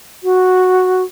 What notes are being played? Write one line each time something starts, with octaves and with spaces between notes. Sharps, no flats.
F#4